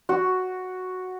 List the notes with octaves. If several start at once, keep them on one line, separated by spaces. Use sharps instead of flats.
F#4